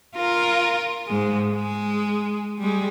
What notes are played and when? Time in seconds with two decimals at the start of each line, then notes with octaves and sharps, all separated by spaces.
0.16 F4 A#4
1.07 G#2 G#3
1.53 G#3
2.59 G3 G#3